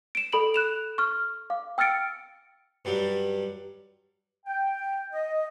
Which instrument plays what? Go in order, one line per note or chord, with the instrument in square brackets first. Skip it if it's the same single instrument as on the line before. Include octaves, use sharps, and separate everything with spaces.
[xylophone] D7 E7
A4 B5 D7 F#7
F#6 E7 F7
C#6 F6
F5 D6
G5 E6 F6 A6 C#7 D7
[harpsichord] G2 F#3 G3
[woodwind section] G5
D#5